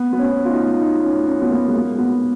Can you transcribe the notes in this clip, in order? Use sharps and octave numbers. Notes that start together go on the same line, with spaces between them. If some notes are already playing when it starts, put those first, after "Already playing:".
Already playing: B3
B3
C#4
F4
D#4
D#4
C#4
C#4
B3
A#3
G#3
A#3
B3